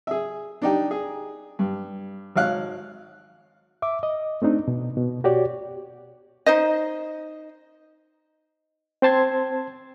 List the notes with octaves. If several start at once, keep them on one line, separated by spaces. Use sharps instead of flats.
G#4 E5
D4 D#4 G4
G#4
G2
G#1 C#5 F5 F#6
E5 D6
D#5
A3 C4 D4 D#4
B2
B2
F#4 G4 C#5 D5
D#4 C5 D#5
C4 C5 A5 C6 G#6